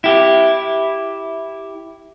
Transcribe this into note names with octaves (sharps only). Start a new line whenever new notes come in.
E4 G4